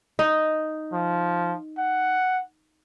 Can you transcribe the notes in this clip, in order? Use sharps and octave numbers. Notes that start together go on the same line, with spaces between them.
D#4
F3
F#5